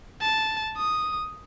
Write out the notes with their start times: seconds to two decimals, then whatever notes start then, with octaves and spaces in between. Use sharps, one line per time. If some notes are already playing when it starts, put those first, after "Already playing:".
0.22 A5
0.77 D#6